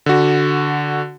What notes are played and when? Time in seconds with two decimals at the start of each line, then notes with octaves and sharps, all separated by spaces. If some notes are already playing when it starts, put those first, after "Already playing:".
0.06 D3 F#4